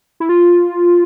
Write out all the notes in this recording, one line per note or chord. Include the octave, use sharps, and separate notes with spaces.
E4
F4